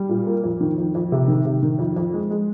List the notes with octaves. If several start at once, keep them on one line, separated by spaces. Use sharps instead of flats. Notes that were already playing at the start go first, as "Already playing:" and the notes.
Already playing: G3
A#2
A#3
F2
D#3
F2
F2
C3
D#3
C3
D#3
F2
F2
G#3
G#3